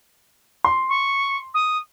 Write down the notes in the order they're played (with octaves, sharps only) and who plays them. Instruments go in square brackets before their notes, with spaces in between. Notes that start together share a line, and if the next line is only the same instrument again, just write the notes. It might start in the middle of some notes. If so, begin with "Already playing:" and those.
[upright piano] C6
[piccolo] C#6
D#6